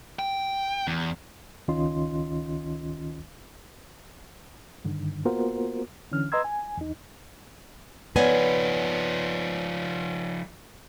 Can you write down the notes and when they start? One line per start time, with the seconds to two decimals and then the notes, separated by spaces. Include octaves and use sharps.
0.19 G5
0.87 E2
1.68 C#2 D#3 C#4 F4 D#5 C6
4.85 G2 D3 D#3
5.25 A#3 B3 F4 F#4 A#4 C5
6.11 D3 E3 C#4 F6
6.32 B4 D#5 A#5 C6 E6 G#6
6.44 G#5
6.77 E2 D#4
8.16 F3 B3 D#4 B4 C#5 D5 G#5